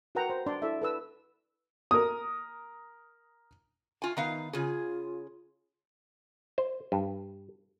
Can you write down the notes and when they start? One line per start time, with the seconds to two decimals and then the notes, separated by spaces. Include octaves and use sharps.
0.15 F#4 A#4 B4 F#5 G5 A#5
0.30 C5
0.46 D4 D5 C6
0.62 E4 A4 D5 E5
0.82 A4 B4 E6
1.91 A#4 D#6
4.02 F4 G#5
4.17 D#3 B3 D#4 F5
4.53 C#3 F4 G#4
6.58 C5
6.92 G2